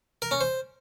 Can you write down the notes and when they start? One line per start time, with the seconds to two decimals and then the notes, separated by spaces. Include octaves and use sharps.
0.22 A#4
0.31 C#4
0.41 C5